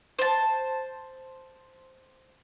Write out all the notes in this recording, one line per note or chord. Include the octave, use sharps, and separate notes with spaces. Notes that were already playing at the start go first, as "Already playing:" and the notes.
C5 A5